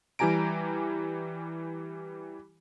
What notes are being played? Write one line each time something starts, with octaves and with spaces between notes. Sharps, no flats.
E3 G3 G4 G#5 A#5 D7